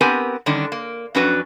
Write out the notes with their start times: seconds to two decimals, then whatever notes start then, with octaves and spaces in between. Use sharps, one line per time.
0.01 B3 C4 G4 A#4 B4 G#5
0.46 D3 D#3 G3 C#4 D4
0.72 A#3
1.15 F2 F#3 C#4 D4 F#4 B4